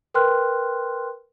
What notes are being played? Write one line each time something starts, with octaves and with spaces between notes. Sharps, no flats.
A#4 B4 G5 C6 F6 F#6